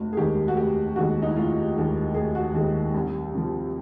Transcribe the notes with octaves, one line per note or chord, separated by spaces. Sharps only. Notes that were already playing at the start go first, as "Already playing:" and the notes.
Already playing: F1 F#4
G#4
D#2 D#3 G#3 G4
F#4
F1 G4
D#2 D#3 G#3 F#4
D#4
E4
F1 F4
D#2 D#3 G#3
F1 G#4
F#4
D#2 D#3 G#3
C2
C3 F3